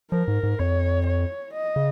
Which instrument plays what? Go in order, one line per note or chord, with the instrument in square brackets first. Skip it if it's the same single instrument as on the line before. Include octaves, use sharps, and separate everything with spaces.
[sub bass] F3 [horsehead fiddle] A#4
[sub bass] G#2
G#2
[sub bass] F2 [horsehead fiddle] C#5
[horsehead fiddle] C#5
D#5
[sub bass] C#3